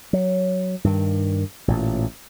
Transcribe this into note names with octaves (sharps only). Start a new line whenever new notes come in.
F#3
G2 D#3
A1 A#2